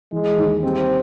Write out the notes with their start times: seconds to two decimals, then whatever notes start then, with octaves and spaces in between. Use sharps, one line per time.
0.12 E3 G#3
0.38 D#2
0.63 G3 C4